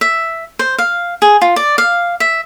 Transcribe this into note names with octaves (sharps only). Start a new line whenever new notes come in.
E5
C5
F5
G#4
F4
D5
F5
E5